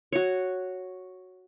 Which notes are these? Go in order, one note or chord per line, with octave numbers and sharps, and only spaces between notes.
F#4 C#5